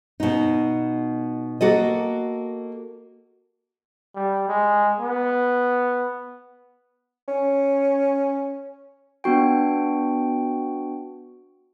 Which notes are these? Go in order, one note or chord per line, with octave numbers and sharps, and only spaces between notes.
B2 D#4
A#3 F#4 A4 D#5
G3
G#3
B3
C#4
B3 D4 F#4 G5